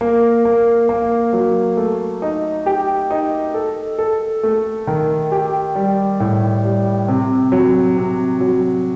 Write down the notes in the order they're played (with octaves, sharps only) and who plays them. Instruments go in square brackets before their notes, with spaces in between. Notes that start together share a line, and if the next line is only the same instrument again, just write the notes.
[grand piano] A#3
A#3
A#3
F#3
A3
D#4
G4
D#4
A4
A4
A3
D#3
G4
G3
A2
G3
C3
F#3
C3
F#3